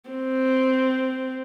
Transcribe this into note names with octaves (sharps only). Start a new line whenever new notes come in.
C4